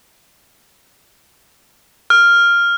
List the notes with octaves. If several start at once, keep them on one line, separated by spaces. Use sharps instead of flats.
F6